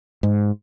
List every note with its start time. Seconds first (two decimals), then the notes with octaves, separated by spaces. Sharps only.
0.23 G#2